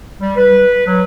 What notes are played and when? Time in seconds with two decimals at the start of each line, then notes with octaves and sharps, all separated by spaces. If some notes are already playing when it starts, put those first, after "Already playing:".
0.20 G3
0.36 B4
0.86 F#3